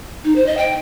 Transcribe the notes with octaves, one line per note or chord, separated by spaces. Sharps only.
D#4
C5
D#5
G5